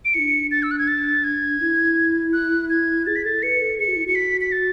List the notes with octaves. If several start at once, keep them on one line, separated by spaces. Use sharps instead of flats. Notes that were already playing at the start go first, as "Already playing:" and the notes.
D7
D4 E4 C#7
A6
E6
F#6
G#6
A6
G#6
E4
F#6
G#6
G#4 A6
B6
A4 A6
B4 C#7
A4
G#4 C#7
F#4
E4
F#4 C#7
B6
B6
A6